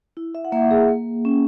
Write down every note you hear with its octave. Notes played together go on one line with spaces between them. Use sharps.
E4
E5
F#5
A#3 E5
G#4
A#3
C#4